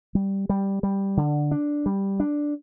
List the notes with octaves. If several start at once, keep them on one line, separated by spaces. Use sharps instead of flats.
G3
G3
G3
D3
D4
G3
D4